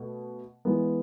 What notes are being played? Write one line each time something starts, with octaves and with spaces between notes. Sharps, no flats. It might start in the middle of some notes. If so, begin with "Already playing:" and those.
Already playing: B2 A3
E3 G#3 B3